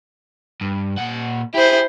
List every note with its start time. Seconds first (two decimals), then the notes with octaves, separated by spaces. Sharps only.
0.61 G2
0.98 A#2 F#5
1.54 E4 G4 G#4 C5